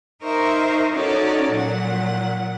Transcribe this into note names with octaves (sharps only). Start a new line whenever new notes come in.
D#4 A#4 C5 E5 C#6
C#4 D#4 F#4 A4 C#5 D5
A#2 F#3 F#5